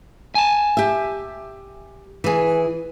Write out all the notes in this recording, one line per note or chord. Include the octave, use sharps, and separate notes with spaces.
G#5 A5
G4 E5
E3 G#4